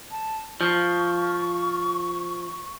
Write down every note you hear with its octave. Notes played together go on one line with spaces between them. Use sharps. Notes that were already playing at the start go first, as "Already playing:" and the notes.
A5
F3 C#6